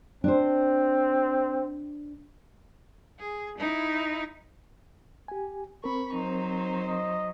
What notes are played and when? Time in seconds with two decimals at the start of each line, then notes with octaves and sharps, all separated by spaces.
0.24 C4 D4 C5
3.19 G#4
3.58 D#4 E4
5.28 G4 G#5
5.84 C4 A#4 B5 C#6
6.14 F#3 D#4 C5
6.84 D#5